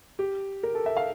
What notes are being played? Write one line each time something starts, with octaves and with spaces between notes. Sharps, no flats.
G4
A#4
A4
E5
F5